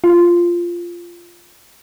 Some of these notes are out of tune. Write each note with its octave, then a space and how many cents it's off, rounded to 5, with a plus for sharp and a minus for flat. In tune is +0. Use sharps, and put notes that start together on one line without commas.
F4 -10